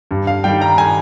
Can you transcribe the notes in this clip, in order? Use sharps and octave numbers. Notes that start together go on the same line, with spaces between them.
G2
F5
D#3 G3 G5
A#5
G#5